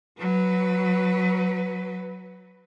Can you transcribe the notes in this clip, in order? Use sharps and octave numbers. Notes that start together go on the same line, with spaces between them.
F#3 B4